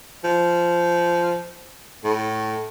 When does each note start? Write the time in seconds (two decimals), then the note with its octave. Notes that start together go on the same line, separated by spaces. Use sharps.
0.24 F3
2.04 A2